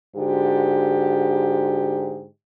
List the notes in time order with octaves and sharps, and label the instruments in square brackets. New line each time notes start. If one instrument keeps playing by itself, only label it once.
[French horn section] G#2 D3 F#4 G4